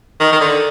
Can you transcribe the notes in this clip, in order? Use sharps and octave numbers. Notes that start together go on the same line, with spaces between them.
D#3
D#3
D3